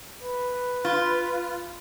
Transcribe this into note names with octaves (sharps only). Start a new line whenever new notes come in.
B4
F4